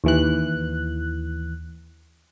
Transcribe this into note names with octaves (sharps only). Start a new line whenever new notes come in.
D#2 E3 F#6